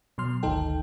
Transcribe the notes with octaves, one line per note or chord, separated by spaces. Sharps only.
B2 F#3 C6 F6
G#1 D2 D#3 D#4 A4 G5